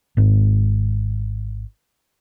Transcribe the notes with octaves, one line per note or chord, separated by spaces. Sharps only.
G#1 G#2